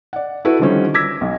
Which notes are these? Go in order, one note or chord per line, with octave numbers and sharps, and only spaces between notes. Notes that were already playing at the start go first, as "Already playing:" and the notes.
D5 F#5
E4 F#4 A4 B4
D3 D#3 F3 G3 C4 C#4
D6 E6 G#6 A#6 B6
B1